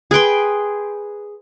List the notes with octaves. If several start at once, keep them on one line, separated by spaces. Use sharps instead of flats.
G#4 B4 G5 C6